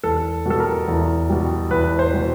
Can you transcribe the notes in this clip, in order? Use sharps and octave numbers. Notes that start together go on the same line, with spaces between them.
E2 A4
B2 G3 A4
A#4
E2
B2 G3
E2 B4
C5
B2 G3